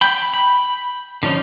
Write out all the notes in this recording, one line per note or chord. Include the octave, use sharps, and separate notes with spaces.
G5 B5
B5
D3 F3 C#4 D#4